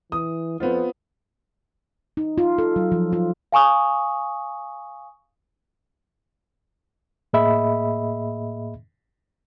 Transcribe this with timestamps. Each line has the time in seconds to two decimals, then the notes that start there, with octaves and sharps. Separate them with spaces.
0.12 E3 D#6
0.60 F2 B3 C4 F4
2.17 D#4
2.38 F4
2.58 A4
2.76 F#3
2.92 F3
3.13 F4
3.52 F5 G#5 C#6 D#6
7.33 A2 A#3 G#4 D#5 E5 B5